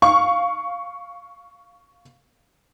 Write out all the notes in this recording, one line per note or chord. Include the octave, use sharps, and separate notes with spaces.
F5 C#6